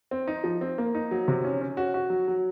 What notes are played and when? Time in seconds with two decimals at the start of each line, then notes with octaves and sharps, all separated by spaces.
0.11 C4
0.27 D#4
0.44 F3
0.61 C4
0.78 A#3
0.95 D#4
1.11 F#3
1.28 C3
1.44 C#4
1.61 C#4
1.77 F#4
1.94 F#4
2.10 F#3
2.28 F#3